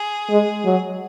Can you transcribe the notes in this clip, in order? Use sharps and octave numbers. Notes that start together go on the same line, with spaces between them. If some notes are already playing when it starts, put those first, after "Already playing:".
Already playing: G#4
G#3
F#3